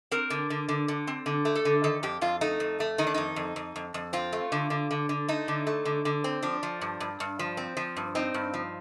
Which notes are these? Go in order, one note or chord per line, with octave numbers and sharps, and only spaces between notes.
C4 A#4
D3
D3
D3
D3
C4
D3
A3
A4
D3
D#3 A4
F2 G4
F2 F4
A3 D#4
F2
A3
D#3 D#4
D4
F2 D#4
F2
F2
F2
F2
C4 F4
A3
D3
D3
D3
D3
A3 D#4
D3
A3
D3
D3
C4
F3 D4
F3
G2
G2
G2
F3
C4
F3
G2
C4 D#4
G2
F3